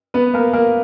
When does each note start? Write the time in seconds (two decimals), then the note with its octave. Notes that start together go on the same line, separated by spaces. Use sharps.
0.14 B3 B4
0.34 A#3 A#4
0.53 A#3 A#4